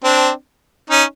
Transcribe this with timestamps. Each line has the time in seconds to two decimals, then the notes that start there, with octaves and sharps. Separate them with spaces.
0.04 C4 D4
0.90 C#4 D#4